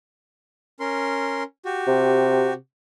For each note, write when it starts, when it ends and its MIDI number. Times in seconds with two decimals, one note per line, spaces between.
0.80 1.43 61
0.80 1.43 70
0.80 1.43 84
1.65 2.53 66
1.65 2.53 67
1.87 2.55 48